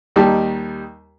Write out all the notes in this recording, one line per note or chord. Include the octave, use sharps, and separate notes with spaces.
D#2 G3 D#4 G4 A5